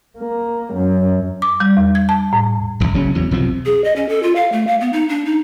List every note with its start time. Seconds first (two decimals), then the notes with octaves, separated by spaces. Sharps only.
0.19 A#3
0.74 F#2
1.42 D6
1.60 G3
1.77 E2
1.95 G#6
2.09 A5
2.33 A2
2.80 D1 G1
2.94 F#1 C#3 F#3 C#4
3.15 E2 F#3
3.31 B1 F2 C3 F3
3.66 G#4
3.84 D#5
3.96 C#4
4.09 A4
4.23 F4
4.35 F5
4.52 A3
4.67 F5
4.81 B3
4.93 D#4
5.09 D4
5.26 D#4